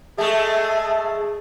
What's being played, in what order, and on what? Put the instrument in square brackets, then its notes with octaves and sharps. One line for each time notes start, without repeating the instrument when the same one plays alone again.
[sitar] G#3 A3 [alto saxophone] G#4 [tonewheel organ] E5 A5